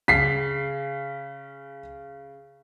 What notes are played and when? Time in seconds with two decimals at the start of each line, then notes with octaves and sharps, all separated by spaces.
0.08 C#3 B6 C7